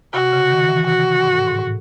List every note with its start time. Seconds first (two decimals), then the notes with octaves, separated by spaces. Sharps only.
0.13 C3 F#4
0.32 C#3
0.50 D#3
0.69 E3
0.87 C3 F#4
1.23 G#2
1.35 A2
1.47 G#2
1.59 A2